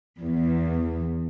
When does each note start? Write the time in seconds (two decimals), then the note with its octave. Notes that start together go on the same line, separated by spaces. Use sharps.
0.20 E2